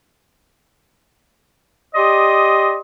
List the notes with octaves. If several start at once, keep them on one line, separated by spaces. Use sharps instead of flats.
G4 D5 D#5 C6 D#6